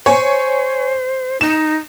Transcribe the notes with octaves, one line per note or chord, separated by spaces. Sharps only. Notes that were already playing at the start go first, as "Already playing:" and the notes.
C5 C#5 G#5
D#4 E7